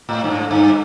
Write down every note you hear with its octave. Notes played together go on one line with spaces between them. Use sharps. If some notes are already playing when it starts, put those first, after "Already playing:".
A2
G2
G#2
G2